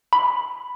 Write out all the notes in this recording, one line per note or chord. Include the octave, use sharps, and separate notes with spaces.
B5